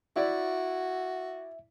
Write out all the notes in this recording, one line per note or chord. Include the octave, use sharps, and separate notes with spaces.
E4 F#4 D5 E5